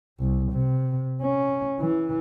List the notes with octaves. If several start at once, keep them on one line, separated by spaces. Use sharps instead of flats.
C2
C3
C#4
E3